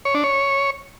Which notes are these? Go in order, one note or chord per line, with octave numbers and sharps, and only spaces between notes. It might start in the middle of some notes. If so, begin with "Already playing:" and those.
C#5
D4
C#5